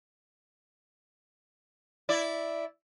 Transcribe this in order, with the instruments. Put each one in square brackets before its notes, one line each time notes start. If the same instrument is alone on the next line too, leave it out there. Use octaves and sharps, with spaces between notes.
[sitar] E4 D5